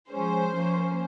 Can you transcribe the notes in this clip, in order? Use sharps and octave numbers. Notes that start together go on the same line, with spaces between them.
F3 G#3 C#4 C5
F3 A#3 C#4